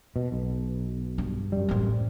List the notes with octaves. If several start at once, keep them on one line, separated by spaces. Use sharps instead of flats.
B2
B1
G2
F#2 G3
A1 C4